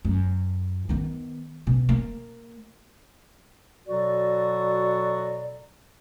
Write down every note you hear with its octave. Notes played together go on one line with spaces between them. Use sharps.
F#2
D#3 B3
B2
A#3
B2 F#3 F#4 A4 D5